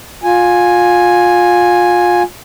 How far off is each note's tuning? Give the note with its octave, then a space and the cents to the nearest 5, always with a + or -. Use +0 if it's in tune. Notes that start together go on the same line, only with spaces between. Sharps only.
F4 +25 G#5 +0